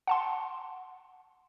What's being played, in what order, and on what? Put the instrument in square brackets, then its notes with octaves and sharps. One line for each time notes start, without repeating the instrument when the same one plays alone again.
[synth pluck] F#5 A5 C6